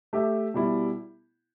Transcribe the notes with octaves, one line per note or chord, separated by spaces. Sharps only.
A3 G4 E5
B2 G3 E4